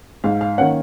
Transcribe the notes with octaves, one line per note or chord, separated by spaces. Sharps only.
G#2 F5
F5
D#3 A#3 C#4 F#5